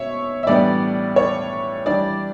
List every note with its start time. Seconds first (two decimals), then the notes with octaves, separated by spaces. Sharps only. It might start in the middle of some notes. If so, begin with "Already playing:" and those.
Already playing: B2 C#5 E5
0.43 E5
0.46 A2 E3 G3 B3 D4 D5
1.16 C#5
1.86 E3 G3 D4 D5